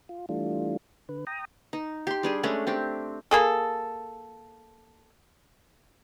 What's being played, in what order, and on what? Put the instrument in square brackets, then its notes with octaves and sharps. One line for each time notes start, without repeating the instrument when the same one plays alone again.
[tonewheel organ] F4
E3 G3 A3 D4 F4
D3 B4
G5 A#5 D#6
[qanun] D#4
G4 C6
G3 D4 G#4
G#3 A3 C#4 D4
C4 D4 G4
[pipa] A#3 G#4 A4